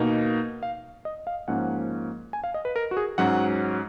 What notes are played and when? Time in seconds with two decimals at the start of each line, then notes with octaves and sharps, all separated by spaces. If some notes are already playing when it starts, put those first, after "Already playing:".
Already playing: B2 A#3 D#4
0.63 F5
1.05 D#5
1.27 F5
1.48 G#2 F3 A#3 C#4 F#5
2.33 G#5
2.44 F5
2.54 D#5
2.65 B4
2.76 A#4
2.91 F#4
2.97 G#4
3.18 G#2 F#3 C#4 F#5